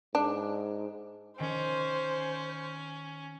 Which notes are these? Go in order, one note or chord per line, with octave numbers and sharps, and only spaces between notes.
G#2 D4
D#3 C#4 C5